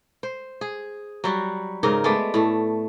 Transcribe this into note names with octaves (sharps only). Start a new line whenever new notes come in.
C5
G#4
F#3 G3 F#4
G#2 C#3 D#4 A#4
G#3 A3 B3 D5
A2 A3